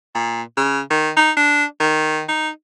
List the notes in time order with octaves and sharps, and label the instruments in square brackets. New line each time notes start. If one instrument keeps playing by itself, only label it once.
[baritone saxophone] A#2
C#3
D#3
D#4
D4
D#3
D#4